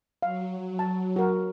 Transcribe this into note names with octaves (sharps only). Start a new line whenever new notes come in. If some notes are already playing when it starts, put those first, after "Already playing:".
F#3 F5
A5
F#4 A#4